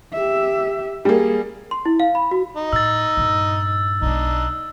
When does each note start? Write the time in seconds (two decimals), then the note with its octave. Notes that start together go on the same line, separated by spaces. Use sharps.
0.13 G4 E5
1.05 G3 A#3 G#4
1.71 C6
1.86 E4
2.00 F5
2.15 B5
2.31 F#4
2.57 D#4
2.73 A2 E6 A6
3.17 G2 A#2
4.02 B1 G#3 D4 D#4